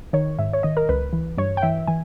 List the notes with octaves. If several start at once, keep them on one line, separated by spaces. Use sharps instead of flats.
D#3 C#5
G#2 E5
C#5
D#3 D#5
A#4
C#2 B4
E3
G2 C#5
G5
E3 E5
E3 G#5